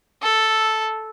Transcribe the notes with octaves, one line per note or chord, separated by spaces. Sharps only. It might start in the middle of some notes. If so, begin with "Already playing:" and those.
A4